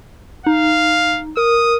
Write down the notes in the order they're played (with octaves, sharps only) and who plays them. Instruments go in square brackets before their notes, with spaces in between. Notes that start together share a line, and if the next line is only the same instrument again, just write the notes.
[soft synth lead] D#4 [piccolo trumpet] F5
[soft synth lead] A#4 [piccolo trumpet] D#6